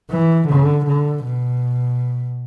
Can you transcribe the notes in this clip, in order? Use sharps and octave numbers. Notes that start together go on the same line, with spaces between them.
E3
D3
D3
B2